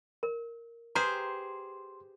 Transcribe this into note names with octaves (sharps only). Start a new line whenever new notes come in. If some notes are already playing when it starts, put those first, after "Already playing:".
A#4
G4 G#4 B4 C5 A#5 C6